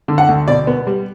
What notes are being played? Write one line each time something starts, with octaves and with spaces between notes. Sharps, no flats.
D3
F#5
D2
B2 D5
B3
G3